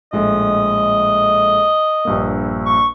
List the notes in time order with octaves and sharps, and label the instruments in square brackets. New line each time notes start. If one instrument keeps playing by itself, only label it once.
[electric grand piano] A#1 A2 G#3 [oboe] D#5
[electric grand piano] A#1 G2 A#3
[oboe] C#6